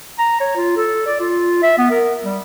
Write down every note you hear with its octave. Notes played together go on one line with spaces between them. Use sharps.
A#5
C#5
F4
A4
D5
F4
E5
B3
A#4
G3